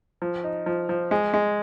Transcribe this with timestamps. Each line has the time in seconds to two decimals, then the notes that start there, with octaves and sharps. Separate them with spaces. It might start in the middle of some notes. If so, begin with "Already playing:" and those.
0.22 F3
0.44 D#4
0.66 F3
0.89 F3
1.11 G#3
1.34 G#3